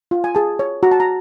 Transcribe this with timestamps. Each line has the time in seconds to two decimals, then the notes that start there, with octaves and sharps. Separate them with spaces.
0.11 F4
0.24 G#5
0.35 G#4 A5
0.59 C#5
0.83 F#4 A#5
0.92 A5
1.00 A#5